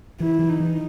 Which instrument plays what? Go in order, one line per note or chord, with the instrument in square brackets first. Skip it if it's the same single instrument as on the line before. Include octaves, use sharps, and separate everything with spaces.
[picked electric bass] E3 [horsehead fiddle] E4
[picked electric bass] E3
[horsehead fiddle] D#4
[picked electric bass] E3